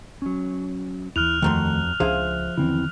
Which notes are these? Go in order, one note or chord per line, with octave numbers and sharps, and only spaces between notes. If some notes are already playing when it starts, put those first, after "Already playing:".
F#3 C#4
D#2 E3 E4 F6 F#6 F7
F2 D#3 A3 F#4 A#5 C6
C#2 F3 C#4 D4 G#4 C5 E5 F5
E2 D3 D#3 C4 C#4 E4